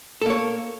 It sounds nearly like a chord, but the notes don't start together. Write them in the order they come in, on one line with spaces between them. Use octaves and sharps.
A4 A#3 C#5